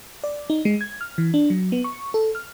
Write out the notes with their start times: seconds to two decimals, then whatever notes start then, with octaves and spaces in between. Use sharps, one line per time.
0.24 D5
0.50 D#4
0.65 G#3
0.81 G#6
1.01 F6
1.18 E3
1.34 D4
1.50 F#3
1.72 B3
1.84 C#6
2.14 A4
2.35 F6